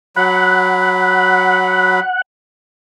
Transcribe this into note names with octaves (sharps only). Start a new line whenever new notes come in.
F#3 F#5 B5